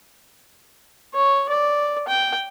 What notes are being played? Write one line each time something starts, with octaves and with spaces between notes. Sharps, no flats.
C#5
D5
G5